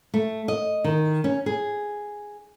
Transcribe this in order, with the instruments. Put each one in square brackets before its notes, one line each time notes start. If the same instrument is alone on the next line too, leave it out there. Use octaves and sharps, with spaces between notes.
[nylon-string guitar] A3
D#5
D#3
C#4
G#4